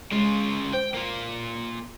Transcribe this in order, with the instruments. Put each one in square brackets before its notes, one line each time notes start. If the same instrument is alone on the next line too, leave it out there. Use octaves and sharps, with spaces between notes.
[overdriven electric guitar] C#3 F4 [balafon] G#3
[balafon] C5 [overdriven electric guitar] G5
[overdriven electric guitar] A#3 F4